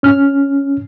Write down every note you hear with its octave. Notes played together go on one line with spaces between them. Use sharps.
C#4 F6